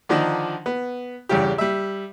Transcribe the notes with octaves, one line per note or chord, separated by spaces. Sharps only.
D3 D#3 F3 D4 D#4
B3
E2 G2 C#3 G4
G3 E5